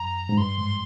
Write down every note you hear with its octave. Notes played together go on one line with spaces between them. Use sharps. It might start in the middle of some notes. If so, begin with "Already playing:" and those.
Already playing: F#2 A#5
G#2
G2 C6
G#2